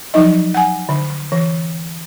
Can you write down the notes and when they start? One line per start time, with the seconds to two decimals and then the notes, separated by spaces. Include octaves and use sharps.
0.14 F3 F#3 D#4 D#5
0.54 F#5 G#5
0.89 D3
1.32 E3